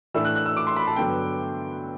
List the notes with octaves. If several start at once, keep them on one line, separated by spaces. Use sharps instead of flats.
A2 E3 A3 D4 E6
F#6
F#6
E6
D6
C6
B5
A5
G2 D3 F#3 B3 G5